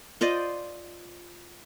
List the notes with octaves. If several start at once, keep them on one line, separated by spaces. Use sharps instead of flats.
F4 C5 D5 D#5